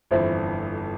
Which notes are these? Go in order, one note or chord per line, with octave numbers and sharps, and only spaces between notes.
G1 F2 E3 C5 E5